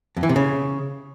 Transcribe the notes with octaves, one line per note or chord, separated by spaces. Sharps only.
F2
E3
C3
C#3